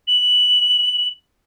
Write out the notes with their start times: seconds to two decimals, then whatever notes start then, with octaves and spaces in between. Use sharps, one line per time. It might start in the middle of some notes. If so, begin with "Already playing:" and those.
0.08 F#7